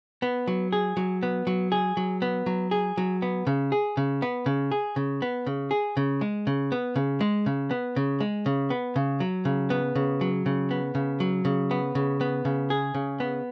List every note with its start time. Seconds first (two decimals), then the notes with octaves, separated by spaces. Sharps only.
0.22 B3
0.47 F#3
0.72 G#4
0.97 F#3
1.23 B3
1.47 F#3
1.72 G#4
1.97 F#3
2.22 B3
2.46 F#3
2.71 G#4
2.97 F#3
3.22 B3
3.47 C#3
3.72 G#4
3.97 C#3
4.22 B3
4.46 C#3
4.71 G#4
4.96 C#3
5.22 B3
5.46 C#3
5.71 G#4
5.97 C#3
6.21 G#3
6.47 C#3
6.72 B3
6.96 C#3
7.21 G#3
7.46 C#3
7.71 B3
7.96 C#3
8.20 G#3
8.46 C#3
8.70 B3
8.96 C#3
9.20 F#3
9.45 C#3
9.70 B3
9.95 C#3
10.21 F#3
10.46 C#3
10.71 B3
10.95 C#3
11.20 F#3
11.45 C#3
11.71 B3
11.95 C#3
12.21 B3
12.45 C#3
12.70 G#4
12.94 C#3
13.20 B3